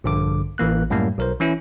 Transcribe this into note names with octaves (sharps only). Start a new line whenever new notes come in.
A#1 G2 D3 D6
A1 E3 A#3 F#6
F#2 A2 G3 A#3
B1 A#4 C5
E3 C#4 E4